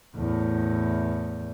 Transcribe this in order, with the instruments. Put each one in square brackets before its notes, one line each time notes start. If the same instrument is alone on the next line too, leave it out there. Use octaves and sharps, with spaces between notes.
[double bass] E2 A2